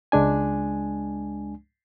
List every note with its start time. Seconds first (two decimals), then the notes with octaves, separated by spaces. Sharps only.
0.12 C#2 G#3 D4 G#5